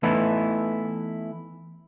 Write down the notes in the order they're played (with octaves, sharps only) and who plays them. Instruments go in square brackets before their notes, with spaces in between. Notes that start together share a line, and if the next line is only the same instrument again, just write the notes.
[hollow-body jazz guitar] E3 A3 B3 D#4 E4